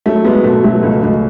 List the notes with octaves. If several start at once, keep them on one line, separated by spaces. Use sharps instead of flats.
F#3 A3
F#3 G#3 B3
B2 A3
F#3 A3
C#2
C#2